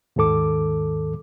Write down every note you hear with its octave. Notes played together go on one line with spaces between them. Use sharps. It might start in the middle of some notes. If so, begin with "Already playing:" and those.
D#2 G#2 D#3 A4 D6